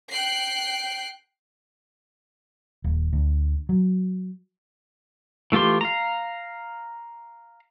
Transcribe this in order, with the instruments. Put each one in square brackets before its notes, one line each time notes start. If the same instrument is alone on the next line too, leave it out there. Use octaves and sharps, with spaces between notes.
[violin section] G5 F#6 C7
[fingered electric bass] D#1
D2
F#3
[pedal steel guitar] E3 A3 F4 G4 C6
F5 A#5